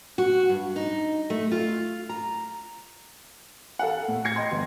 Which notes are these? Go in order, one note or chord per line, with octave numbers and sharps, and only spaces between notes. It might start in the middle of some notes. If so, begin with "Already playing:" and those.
F#4
G2
D#4
A3
F4
A#5
A4 F5 F#5
A2
G#6 A#6 C7 C#7
D#5 G5 C6
G1